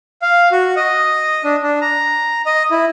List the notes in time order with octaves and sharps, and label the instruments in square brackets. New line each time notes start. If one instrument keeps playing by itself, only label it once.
[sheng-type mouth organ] F5
F#4
D#5
D4
D4
A#5
D#5
E4